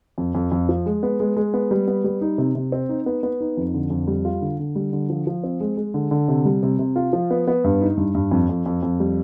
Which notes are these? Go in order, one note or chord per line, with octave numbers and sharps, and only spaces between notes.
F2
F2
F2
F3
G#3
B3
G#3
G#3
B3
G3
B3
G3
D#4
C3
C3
C4
D#4
B3
B3
D#4
F2
D3
F2
G3
F4
D3
D3
G3
D3
F3
F3
C4
G#3
G#3
D3
D3
C3
G3
C3
C3
F4
F3
B3
B3
G2
D#4
G2
G2
F2
F2
F2
F2
G3